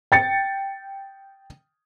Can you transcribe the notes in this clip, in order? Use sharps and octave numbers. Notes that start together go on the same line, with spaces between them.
G5 A6 C#7